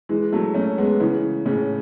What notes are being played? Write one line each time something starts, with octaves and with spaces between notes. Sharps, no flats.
E3 G#3
F#3 A3
A3 C#4
G#3 B3
C#3 E3
A2 C#3